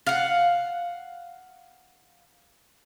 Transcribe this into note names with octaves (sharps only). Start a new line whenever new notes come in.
F5 F#5